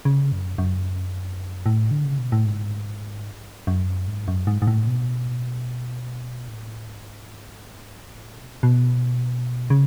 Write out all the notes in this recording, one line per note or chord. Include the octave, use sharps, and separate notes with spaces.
C#3
F#2
F#2
A2
D3
C#3
B2
A2
G#2
F#2
G#2
F#2
G#2
G#2
A2
B2
A2
G#2
A2
B2
B2
C#3